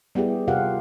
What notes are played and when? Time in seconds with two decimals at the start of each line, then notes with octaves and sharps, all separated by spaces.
0.15 G3 B3 E4 G4 G#4
0.48 C3 F4 G4 A#4 F5 F#5